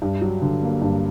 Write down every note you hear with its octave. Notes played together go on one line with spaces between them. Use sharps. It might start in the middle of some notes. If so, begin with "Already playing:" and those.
G2
F#3
D3
A#3
G2